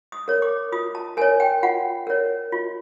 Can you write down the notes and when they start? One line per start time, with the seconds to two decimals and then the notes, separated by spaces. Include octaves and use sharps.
0.12 D#6
0.28 A#4 C#5
0.42 D6
0.72 F4 D#6
0.95 A5
1.17 A#4 C#5 G#5
1.40 G5
1.63 F4 F#5
2.07 A#4 C#5
2.52 F4